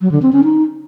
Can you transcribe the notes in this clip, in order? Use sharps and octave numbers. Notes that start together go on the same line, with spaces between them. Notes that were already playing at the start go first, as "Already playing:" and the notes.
F#3
D3
C4
C#4
D#4